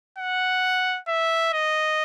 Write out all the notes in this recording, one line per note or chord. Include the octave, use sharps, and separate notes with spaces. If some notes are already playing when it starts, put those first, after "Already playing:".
F#5
E5
D#5